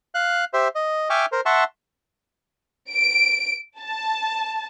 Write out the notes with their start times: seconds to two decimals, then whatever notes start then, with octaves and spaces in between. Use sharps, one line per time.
0.15 F5 F#6
0.54 G4 C5 E5
0.75 D#5
1.10 E5 G5 G#5 C#6 D6 F6
1.32 A#4 C5
1.46 E5 F#5 A5 C6 C#6
2.91 D7
3.80 A5